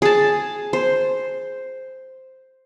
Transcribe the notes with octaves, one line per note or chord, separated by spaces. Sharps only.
G#4 A5
C5